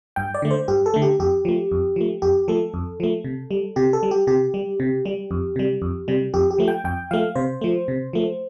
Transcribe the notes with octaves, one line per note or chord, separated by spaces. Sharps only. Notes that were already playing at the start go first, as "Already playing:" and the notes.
G2 G5
D5
D3 A3
C5
G2 G4
A4
D3 A3
G4
F2 G4
F3 A3
F2
F3 A3
F2 G4
F3 A3 A4
F2
F3 A3
C3
G3
C3 G4
A4
G3
G4
C3 G4
G3
C3
G3
F2
C3 G3
F2
C3 G3
F2 G4
G4
F3 A3
G5
F2 G5
F3 A3 F5
C3 C5
F3 A3
C3
F3 A3